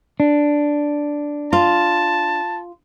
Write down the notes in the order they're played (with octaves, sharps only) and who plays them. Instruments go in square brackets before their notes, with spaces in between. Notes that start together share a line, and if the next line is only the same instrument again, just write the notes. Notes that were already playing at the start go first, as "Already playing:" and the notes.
[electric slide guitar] D4
[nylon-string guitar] F4 [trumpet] A5